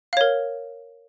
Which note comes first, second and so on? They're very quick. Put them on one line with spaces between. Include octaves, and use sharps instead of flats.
F5 C#5 A#4